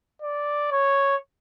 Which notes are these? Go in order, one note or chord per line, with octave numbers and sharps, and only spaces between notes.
D5
C#5